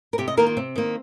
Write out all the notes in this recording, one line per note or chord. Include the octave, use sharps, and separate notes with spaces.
A#4
C3 G4
D#5
D#3 A#3 A#4
F4
C3 C4
D#3 A#3